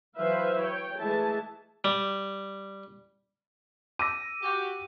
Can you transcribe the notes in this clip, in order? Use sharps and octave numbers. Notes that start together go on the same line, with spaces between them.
E3 F#3 B4 C5 E5 F5
C#5 G5
E3 G#3 A3 E5 A5
G3
D6 E6 A#6 D#7
F#4 G4 G5